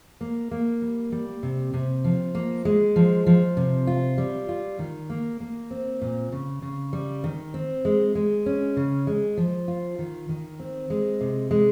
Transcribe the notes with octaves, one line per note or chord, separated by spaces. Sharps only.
A#3
A#3
G3
G3
C3
C3
F3
A#3
G#3
F3
F3
C3
F4
G3
F4
D#3
A#3
A#3
C4
A#2
C#3
C#3
G3
D#3
C4
G#3
G#3
C#4
C#3
G#3
F3
F4
D#3
D#3
C4
G#3
C3
G#3